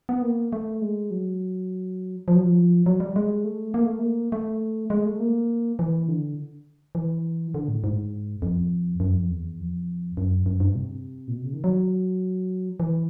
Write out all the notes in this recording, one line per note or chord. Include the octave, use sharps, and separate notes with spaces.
B3
A#3
A3
G#3
F#3
F3
F#3
F3
F#3
G3
G#3
A3
A#3
A3
A#3
A3
G#3
A3
A#3
E3
D3
E3
D3
A2
G#2
F2
F#2
F2
E2
F2
F#2
F#2
G2
C3
A#2
B2
C#3
D#3
F#3
E3